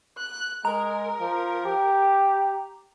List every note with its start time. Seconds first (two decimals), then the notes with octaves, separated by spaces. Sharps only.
0.17 F#6
0.65 G#3 A#4 A#5
1.20 F3
1.65 G4